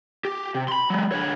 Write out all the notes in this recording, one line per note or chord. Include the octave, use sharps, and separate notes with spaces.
G4
C3
B5 C6
F#3 G#3
D3 C#5